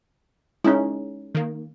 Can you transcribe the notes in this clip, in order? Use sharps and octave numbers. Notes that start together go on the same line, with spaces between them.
G#3 C#4 D#4 E4
D#3 A#3